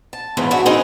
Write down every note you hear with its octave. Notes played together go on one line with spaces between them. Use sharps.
A5
E2 G#2 C#3 E3
D4 E4 F#4 G#4
B3 C4 D#4 G4 G#4 A#4